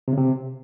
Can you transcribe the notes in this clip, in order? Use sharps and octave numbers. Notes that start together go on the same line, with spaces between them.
C3
C#3
C3